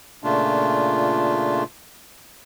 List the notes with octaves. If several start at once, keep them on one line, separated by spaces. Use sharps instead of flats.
A#2 C#3 A3 D4 F4